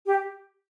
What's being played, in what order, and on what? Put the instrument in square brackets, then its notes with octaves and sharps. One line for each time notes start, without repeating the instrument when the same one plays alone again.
[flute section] G4